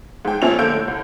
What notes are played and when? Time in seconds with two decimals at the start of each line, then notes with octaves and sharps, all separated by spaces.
0.25 G#2 G5
0.42 F2 A#2 F3 C#4 E5 F7
0.59 D3 A#3 E6 G6 D7
0.72 A2
0.88 C2